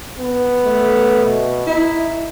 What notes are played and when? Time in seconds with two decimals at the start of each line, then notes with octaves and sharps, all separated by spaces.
0.19 B3
0.65 A3
1.24 B2
1.67 D#4 E4